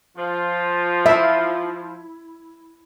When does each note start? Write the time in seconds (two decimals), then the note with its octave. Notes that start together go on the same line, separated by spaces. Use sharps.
0.17 F3 F4
1.06 E4 E5